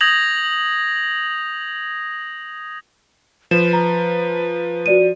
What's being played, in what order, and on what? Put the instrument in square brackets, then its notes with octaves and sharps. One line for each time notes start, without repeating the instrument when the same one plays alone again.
[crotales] D#6 G6 G#6 A#6 F7 F#7
[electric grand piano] F3 [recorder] B4 [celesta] E7
[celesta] A#5
F#4 D5 D#7